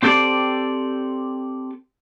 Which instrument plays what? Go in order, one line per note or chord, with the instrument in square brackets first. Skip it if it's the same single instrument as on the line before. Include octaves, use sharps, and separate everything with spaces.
[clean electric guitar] C4 G4 A4 C5 D5